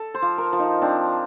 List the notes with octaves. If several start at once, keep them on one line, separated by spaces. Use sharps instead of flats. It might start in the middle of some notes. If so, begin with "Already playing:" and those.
Already playing: A4
C5
F3
A#4
F3
D#4
C4 D4